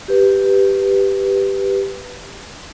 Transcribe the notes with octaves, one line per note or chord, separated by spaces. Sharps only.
G4 B4